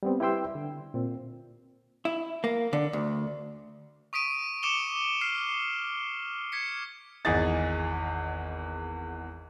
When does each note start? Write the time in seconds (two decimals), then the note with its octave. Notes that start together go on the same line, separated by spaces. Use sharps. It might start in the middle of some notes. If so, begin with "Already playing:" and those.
0.03 G3 B3 C4
0.20 E4 G4 B4 G5 C6 E6
0.55 D3
0.94 A#2 C4
2.05 E4
2.44 A#3
2.73 D3
2.93 D2
4.13 C#6 D#6 B6 D7 D#7
4.63 D6 C#7 D7 E7 F7 G7
5.21 F6 C7
6.52 G#6 B6 C#7
7.25 G#1 E2 G#4 D#5 A6